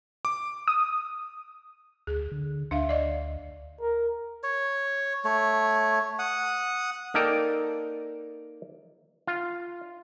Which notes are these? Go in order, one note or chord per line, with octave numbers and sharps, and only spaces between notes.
D6
D#6
D2 G#4
D3
D2 D4 E5 F5
D5 D#5
A#4
C#5
A3 C#5
F#5 D#6
A#3 D#4 A4 A#4 D5 G5
F4